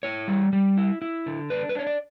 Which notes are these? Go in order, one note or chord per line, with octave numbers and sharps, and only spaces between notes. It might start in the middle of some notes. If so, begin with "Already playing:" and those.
E4 C#5
G3
G3
E4
E4
D3
D4 B4
B4
D4 C#5
D5